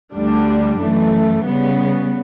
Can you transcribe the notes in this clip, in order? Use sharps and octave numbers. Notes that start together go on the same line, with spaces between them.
D2 D3 G3 D4
F#2 E3 A3
C#3 G3 B3